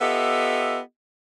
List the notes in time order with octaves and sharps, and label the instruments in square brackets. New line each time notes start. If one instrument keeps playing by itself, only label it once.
[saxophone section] B3 F4 G4 A4 D#5 E5